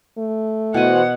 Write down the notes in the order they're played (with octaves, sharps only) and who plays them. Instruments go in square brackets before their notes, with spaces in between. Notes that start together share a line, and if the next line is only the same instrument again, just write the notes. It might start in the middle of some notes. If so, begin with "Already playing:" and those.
[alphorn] A3
[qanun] B2 G#5 [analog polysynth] E3 F#4 C5 [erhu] F#5